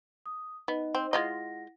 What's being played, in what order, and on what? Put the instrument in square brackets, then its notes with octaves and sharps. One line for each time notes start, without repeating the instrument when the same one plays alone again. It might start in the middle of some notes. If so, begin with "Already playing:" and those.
[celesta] D#6
[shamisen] B3 [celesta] D#4 D#5
[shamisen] C4
[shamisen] G#3 F4 D#5 [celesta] E4 F#5 A#6